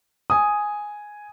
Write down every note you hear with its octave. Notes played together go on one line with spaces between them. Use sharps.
G#5 D#6